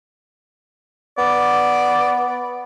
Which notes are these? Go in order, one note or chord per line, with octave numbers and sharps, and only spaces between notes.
B3 D5